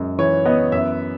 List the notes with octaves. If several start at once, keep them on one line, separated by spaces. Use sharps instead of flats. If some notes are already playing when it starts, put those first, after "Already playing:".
Already playing: F#2 G#3
E3 C#5
B3 D#5
F#2 E5